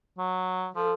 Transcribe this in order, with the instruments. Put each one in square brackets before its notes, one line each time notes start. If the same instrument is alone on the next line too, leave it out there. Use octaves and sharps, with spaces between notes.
[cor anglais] F#3
[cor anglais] F3 [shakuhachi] A4